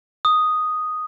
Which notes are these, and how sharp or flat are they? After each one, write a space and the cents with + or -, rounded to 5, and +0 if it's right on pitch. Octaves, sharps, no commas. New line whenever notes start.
D#6 +0